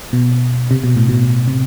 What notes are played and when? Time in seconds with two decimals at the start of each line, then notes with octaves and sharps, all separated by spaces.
0.13 B2
0.71 C3
0.84 B2
0.96 A2
1.09 B2
1.48 C3